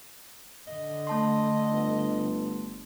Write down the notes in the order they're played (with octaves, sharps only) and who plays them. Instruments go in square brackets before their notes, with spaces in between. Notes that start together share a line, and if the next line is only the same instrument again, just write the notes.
[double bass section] D3 [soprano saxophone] D#5
[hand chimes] A3 A5 C6
[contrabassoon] G1